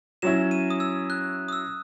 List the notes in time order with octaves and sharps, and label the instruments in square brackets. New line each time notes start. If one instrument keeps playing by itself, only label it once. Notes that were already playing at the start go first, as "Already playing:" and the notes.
[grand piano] F#3 C#4 E4 [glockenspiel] E7
[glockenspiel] D#7
D#6
E6
F#6
D#6
E6